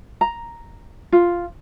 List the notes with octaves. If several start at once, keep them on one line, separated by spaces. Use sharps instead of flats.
A#5
F4